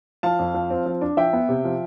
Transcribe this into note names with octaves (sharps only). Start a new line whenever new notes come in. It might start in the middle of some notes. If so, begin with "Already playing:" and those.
F3 F5 A5
F2
F3
C4
F3
D4
F3 E5 G5
B3
C3
F3